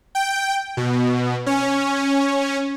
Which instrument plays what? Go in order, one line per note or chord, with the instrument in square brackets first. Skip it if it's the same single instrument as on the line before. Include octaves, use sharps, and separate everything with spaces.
[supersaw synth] G5
B2
C#4